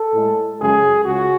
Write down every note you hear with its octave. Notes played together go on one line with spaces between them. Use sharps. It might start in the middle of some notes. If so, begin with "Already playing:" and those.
Already playing: A4
A2 G#3
F#2 C#3 G#3 G#4
C#2 C#3 F#4